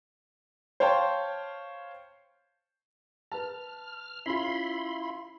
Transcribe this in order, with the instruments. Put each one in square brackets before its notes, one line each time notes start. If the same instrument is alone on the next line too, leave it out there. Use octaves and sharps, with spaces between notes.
[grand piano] C5 C#5 F5 G5 A5 C6
[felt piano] B4 A5 [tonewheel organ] F6
[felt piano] C#4 F4 [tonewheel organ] E4 B5 C6